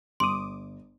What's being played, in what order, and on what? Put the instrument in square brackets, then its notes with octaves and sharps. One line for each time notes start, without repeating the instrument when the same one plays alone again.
[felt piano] G1 [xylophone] C6 [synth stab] D6 D#6